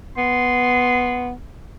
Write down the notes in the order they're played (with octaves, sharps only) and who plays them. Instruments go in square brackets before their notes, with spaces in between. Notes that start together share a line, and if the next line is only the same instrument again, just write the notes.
[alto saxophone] B3 [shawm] C6